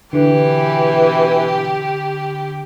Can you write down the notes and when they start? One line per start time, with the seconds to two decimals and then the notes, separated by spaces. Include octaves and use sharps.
0.13 B2 D3 E3 G4